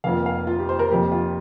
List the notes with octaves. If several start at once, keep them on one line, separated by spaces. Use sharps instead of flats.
F1 F2 F3 A#3 F5
F5
F4
G4
C5
A#4
F1 F2 F3 A#3 G4
F4